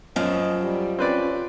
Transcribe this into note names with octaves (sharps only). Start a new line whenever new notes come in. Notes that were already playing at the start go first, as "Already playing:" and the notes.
F#2 F3 D#5
G3
C4 C#4 B4 D5